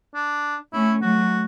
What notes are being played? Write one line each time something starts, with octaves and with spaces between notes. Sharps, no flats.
D4
A3 C#4 E4
F#3 A3 F#4